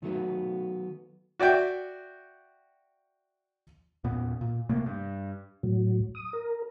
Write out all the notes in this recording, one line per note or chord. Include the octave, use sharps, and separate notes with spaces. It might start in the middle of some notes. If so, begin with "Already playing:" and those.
D#3 F#3 A3 B3
F#4 D5 E5 G5
E2 A#2 B3
A#2
C3 A3 A#3
G2
A2 F#3
D#6
A#4